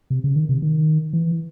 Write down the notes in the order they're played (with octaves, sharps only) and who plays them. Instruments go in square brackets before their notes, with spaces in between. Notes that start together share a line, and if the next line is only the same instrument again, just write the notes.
[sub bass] C3
C#3
D#3
C3
D#3
E3